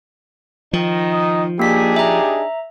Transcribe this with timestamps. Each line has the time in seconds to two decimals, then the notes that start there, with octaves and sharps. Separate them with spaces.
0.73 D#3 F3 D#4
1.12 D#5
1.59 A#3 D4 D#4 G4 G#4 B6
1.96 E5 A#5